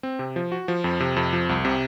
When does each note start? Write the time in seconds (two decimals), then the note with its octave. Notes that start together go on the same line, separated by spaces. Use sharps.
0.03 C4
0.19 C3
0.36 F3
0.52 F#4
0.68 F3
0.84 F2
1.00 C3
1.16 F2
1.33 F3
1.49 C2
1.65 C3